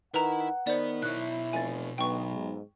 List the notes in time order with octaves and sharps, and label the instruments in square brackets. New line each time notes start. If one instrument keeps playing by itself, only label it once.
[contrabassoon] D#3 [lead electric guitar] E4 [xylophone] B4 A#5 [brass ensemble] F#5
[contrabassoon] D#3 [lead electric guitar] B3 [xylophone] C5 D5
[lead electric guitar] B2 C#5 [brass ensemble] E4 [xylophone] F#6
[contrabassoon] F1 [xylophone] G#5 A6
[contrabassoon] B1 [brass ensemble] D3 G#3 B3 [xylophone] G5 C#6
[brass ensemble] G#2